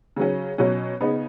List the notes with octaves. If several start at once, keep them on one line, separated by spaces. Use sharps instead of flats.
C#3 F#3 C#4
B2 F#3 C#4
C#3 B3 D#4